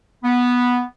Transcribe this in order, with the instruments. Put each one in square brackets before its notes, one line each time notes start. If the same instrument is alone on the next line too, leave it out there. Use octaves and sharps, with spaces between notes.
[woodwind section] B3